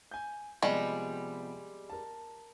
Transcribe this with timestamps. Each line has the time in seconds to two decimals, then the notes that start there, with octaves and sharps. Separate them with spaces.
0.11 G#5 G6
0.62 C3 F3 G3 G#3 B3
1.90 A#4 A5